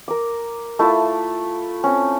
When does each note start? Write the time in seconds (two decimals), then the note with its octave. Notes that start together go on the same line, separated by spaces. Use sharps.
0.08 A#4 D6
0.79 A3 E4 F4 A5
1.84 C4 C#4